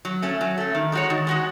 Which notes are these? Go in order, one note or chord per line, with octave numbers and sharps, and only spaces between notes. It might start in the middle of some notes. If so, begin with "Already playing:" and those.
F#3
A3 C#4
F#3
A3 C#4
D#3
G#3 D#4 F#4 C#5
D#3
G#3 D#4 F#4 C#5